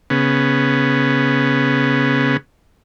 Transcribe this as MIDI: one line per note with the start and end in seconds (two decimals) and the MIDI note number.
0.10 2.37 49
0.10 2.37 59